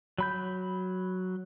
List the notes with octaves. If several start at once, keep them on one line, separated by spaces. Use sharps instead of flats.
F#3 B5 G6